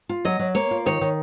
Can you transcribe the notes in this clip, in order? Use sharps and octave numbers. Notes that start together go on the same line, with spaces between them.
F4
F#3 D#5
F#3
A#3 C#5
F4
D#3 C#5
D#3